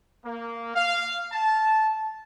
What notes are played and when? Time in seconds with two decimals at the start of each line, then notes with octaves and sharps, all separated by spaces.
0.25 A#3
0.76 F5
1.32 A5